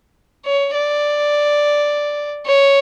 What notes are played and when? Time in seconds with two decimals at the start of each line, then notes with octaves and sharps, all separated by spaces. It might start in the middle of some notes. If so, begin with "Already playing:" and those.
0.45 C#5
0.74 D5
2.46 C#5